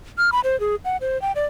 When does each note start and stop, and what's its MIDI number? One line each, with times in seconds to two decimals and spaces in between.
0.18 0.30 89
0.32 0.40 83
0.44 0.59 72
0.60 0.76 68
0.85 0.97 78
1.01 1.20 72
1.22 1.32 79
1.36 1.45 74